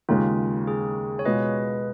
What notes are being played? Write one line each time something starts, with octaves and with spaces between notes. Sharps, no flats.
D#2 C#3 G#3 F4
G#4
C#5
B2 G#3 B3 F4 B4 D#5